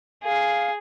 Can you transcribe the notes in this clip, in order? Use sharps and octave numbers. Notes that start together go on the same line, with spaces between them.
G#4 F5